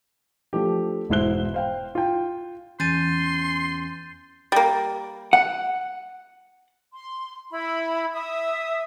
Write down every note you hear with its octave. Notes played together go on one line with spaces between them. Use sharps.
F3 A3 D4 G4
E1 G#2 E4 C5 F#6 G7
C5 F5 G5
F4 G5
E2 C#4 A5 C6 G6 A6 D#7
G3 A#3
F#5
C6
E4 B5
E5 D#6